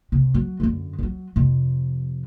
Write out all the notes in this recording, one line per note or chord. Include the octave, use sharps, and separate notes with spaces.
C3
F#3
F#2 D3
F3 F#3
F2 C3